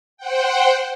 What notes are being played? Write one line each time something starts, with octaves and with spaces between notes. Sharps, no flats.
C5 F#5 G5